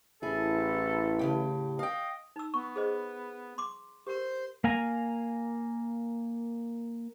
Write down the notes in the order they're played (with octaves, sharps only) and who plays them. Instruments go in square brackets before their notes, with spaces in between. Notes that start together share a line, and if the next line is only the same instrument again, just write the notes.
[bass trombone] A1 [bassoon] E4 [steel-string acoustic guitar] G#4 [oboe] A4
[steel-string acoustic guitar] A2 C#3 G4
[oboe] D#5 [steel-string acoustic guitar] F5 G5
[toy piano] D#4 E6
[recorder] B3 [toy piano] C#6
[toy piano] G#4 C5 D#5
C6 D6
[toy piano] G4 A#4 [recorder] C5
[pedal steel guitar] A#3 F5 G#5 A#5